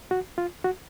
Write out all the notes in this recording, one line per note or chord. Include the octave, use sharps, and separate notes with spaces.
F#4
F4
F#4